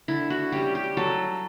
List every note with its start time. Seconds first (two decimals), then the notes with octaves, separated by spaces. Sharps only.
0.08 D3 E4
0.30 F#4
0.52 G3 C#4 G4
0.75 G4
0.97 F#3 A4